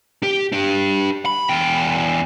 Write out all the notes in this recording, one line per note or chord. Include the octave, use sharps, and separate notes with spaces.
G4
D4 G4
B5
E2 G5